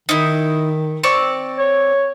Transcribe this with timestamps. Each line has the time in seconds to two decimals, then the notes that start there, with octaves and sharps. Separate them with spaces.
0.09 D#3 D#4 E4
1.04 C4 D5 C#6
1.59 C#5